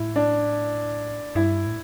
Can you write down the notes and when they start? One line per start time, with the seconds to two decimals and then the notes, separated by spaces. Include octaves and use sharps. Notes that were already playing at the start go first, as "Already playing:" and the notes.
Already playing: A2 E4
0.16 D4
1.35 G2 E4
1.66 A2